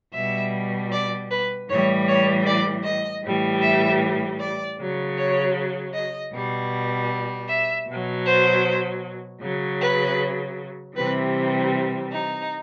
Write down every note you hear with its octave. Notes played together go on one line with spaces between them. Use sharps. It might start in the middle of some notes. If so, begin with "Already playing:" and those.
B2 G3 E5
D5
B4
A2 E3 G3 C#5
C#5
D5
D#5
A2 E3 G3
E5
D5
C#3 F#3
C#5
D#5
B2 G3
E5
B2 F#3
C5
C#3 F#3
B4
C3 E3 G3 B4
D#4